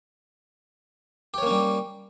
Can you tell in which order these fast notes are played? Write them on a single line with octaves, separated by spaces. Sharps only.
G4 C#5 A#3 C#4 G3